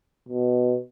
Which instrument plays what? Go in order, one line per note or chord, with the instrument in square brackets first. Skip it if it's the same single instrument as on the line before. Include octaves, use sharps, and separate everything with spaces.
[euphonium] B2